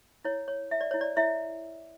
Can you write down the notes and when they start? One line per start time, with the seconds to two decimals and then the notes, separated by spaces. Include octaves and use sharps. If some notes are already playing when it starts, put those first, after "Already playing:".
0.24 E4 C#5
0.48 C#5
0.71 E4 E5
0.81 D5
0.91 E4 C#5
1.01 D5
1.16 E4 C#5 E5